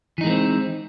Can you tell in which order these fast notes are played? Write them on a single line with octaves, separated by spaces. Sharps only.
E3 D#4 G#3 A#3 C4